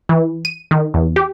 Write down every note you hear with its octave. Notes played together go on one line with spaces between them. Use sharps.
E3
D#7
D#3
E2
G4